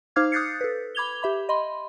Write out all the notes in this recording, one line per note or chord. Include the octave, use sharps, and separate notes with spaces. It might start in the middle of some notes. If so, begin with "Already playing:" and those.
D#4 C5 F5 D6 F6 G#6
D#6 F#6 G6 A6 C7 C#7
A4 B4
B5 D6 G#6 F7 G7
G4 E5 B5
D#5 B5 C6